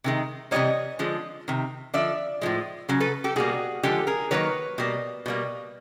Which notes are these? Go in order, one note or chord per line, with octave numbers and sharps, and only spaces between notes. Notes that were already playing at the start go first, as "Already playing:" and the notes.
C3 D#3 G#3
C3 E3 G3 A#3 C#5 D#5
D3 F3 G#3
C3 D#3
D3 F3 D5 E5
A2 F3 G#3
C#3 F#3
A4 B4
G4 A4
B2 G3 A#3 F#4 G#4
D3 F3 G#3 G4 A4
G#4 A#4
D#3 F#3 A#3 B4 C#5
B2 G3 A#3
B2 G3 A#3